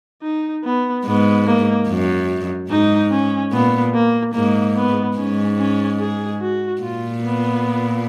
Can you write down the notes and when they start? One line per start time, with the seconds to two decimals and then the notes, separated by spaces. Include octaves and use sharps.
0.23 D#4
0.64 B3
1.05 G#2 B3
1.47 A#3
1.88 F#2
2.70 G#2 D#4
3.11 C#4
3.52 A#2 B3
3.94 A#3
4.34 G#2 A#3
4.76 B3
5.17 G#2 C#4
5.59 C#4
6.00 G#4
6.41 F#4
6.82 A#2 F4
7.23 B3